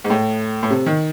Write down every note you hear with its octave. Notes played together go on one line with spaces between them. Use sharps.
G#2
A2
A2
C3
D#3